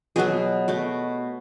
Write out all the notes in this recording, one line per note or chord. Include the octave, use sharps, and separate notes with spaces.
B2 F#3 B3 G#4
B2 A3